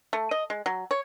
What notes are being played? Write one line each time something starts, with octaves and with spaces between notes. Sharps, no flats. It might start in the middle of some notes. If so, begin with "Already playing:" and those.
A3
D#5
G#3
F#3
C#5